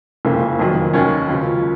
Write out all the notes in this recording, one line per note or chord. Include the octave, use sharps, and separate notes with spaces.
F#1 F2 C#3 A#3
F1 F2 D#3 F#3
D#2 D#3 F#3 C#4
C#2 C#3 F3